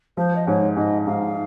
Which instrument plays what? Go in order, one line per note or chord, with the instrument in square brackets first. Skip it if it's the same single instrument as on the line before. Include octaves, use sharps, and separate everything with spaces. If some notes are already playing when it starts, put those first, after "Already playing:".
[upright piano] F3 [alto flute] C5
[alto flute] D#5
[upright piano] G#2 [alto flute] C#5
[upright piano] G#2 [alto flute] D#5
[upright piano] G#2 [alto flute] F5